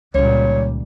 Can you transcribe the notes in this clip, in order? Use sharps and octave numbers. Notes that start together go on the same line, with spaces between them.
C#2 A#2 D#3 G3 C#5